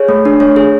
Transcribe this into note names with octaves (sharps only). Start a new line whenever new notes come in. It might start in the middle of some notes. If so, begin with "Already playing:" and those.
Already playing: G#4 C#5
A3
D4
A3 C#5
G#4